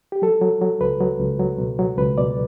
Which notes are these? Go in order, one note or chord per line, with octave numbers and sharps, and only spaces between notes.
G4
F#3 A4
F#3
F#3
C#2 B4
F#3
C#2
F#3
B2
F#3
C#2 B4
B2 D5